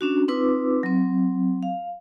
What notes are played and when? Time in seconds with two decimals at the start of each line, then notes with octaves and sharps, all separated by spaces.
0.01 C#4 D4 F#4
0.28 C4 D#4 F4 B4 D6 E6
0.83 F#3 C4
1.63 F5